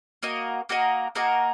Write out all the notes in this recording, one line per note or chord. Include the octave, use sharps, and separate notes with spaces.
A#3 F#4 A#4 D#5
A#3 F#4 A#4 D#5
A#3 F#4 A#4 D#5